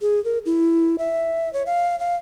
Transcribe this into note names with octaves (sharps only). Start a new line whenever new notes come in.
G#4
A#4
E4
E5
C#5
F5
F5